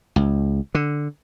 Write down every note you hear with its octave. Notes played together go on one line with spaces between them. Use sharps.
C#2
D3